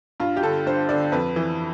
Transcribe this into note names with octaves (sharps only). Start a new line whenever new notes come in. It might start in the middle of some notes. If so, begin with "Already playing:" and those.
G2 F4
G4
D3 A4
G2 C5
D3 D5
F2 B4
E3